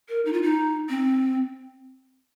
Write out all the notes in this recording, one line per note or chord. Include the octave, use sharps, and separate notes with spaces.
A#4
D#4
F4
D#4
C4